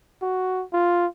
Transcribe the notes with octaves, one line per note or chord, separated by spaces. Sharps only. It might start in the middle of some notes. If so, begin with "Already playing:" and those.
F#4
F4